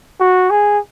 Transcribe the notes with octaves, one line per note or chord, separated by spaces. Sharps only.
F#4
G#4